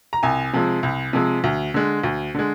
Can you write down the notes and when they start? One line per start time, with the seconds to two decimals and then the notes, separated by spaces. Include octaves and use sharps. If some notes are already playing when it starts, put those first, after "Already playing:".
0.13 A#5
0.23 C2 G#5
0.53 C3 F3 G#3
0.83 C2
1.13 C3 F3 G#3
1.44 D2
1.74 D3 G#3
2.04 D2
2.35 D3 G#3